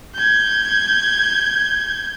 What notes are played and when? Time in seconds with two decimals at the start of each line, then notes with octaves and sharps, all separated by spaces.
0.14 G6 G#6